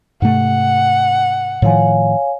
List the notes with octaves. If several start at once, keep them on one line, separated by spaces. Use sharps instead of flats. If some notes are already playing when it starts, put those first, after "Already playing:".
G#2 C3 A3 F#5
A2 D#3 F3 C#5 F5 G#5